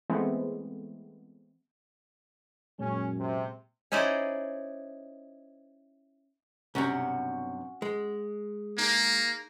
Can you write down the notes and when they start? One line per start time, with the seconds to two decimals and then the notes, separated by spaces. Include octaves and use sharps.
0.10 E3 G#3 A3 B3 C4
2.79 F#2 A#2 G#3 C#4
3.18 C3
3.92 C#4 D#4 E4 C5 D5 D#5
6.75 B1 G2 C3 C#4 F#4 F#5
7.82 G#3
8.78 A#3 D#4 G#4